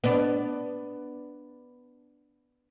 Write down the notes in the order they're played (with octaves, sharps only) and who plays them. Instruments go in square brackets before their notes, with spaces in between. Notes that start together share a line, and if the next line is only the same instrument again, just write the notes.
[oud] B3 D4